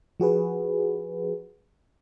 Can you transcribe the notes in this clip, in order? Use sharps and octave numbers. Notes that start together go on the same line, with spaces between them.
F3 F#4 G#4 B4